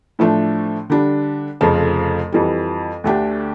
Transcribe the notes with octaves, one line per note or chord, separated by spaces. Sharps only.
A2 F3 A3 D4
D3 G3 D4
F1 F2 C#3 F3
F2 E3 G3
D2 D3 A3 D4 G4